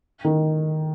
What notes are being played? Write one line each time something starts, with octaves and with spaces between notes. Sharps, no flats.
D#3